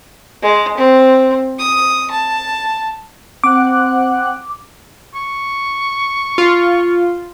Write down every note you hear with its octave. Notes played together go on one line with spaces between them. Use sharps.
G#3
C4
D#6
A5
C4 F#5 D6 F#6
C#6
F4